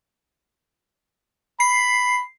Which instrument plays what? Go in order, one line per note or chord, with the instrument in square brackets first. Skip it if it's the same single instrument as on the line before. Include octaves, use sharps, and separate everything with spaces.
[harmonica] B5 [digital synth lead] C7